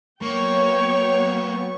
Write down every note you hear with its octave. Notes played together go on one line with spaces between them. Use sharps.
F#3 A#3 B3 C#5 G5 C#6